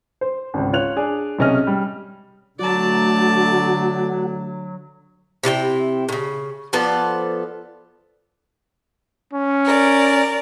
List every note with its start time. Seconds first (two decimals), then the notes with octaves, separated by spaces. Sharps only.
0.21 C5
0.54 G#1 C#2
0.73 F4 C#5 F#6 F7
0.96 D4 G#4 D5
1.39 B1 C3 C#4 G#4 D#5 F6
1.67 G3
2.59 D3 F#3 A3 F#4 D5 A5
5.43 C3 E4 A4 G5
6.09 A2 C#3
6.73 F3 B3 A4 D5
9.33 C#4
9.65 A#4 D5